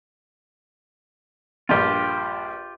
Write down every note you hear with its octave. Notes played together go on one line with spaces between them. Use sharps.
A#1 G2 F4 G4